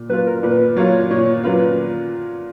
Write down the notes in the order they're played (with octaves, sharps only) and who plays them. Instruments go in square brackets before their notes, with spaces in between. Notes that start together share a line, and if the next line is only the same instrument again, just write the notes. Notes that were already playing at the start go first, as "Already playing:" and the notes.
Already playing: [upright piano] A#2
[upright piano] F#3 A#3 F4 [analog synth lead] B4
[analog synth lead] A#4
[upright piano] A#2 [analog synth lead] B4
[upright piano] F#3 A#3 F4 [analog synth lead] C#5
[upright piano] A#2 [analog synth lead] C#5
[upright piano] F#3 A#3 F4 [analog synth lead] B4